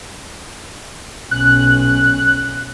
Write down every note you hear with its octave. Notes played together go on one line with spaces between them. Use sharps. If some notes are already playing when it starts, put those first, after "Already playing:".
B1 C#4 F#6